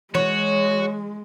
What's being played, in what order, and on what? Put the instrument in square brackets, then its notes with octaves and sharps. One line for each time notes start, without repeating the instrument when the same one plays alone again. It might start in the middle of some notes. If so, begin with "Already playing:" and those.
[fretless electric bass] E3 [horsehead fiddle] G#3 [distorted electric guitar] F#4 [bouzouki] C#5